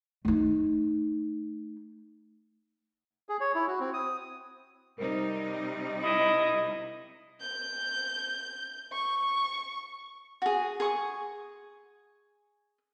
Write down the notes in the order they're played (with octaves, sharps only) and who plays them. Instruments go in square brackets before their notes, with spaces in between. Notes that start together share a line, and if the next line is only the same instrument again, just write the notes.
[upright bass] A3 D#4
[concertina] G#4
C#5
E4
F#4
C4
D#6
[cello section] C3 G3 D#4 [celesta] A#4 C5
[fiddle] E4 [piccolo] D#5
[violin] G6
C#6
[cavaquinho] F#4 G#4
G#4 C#6 D#6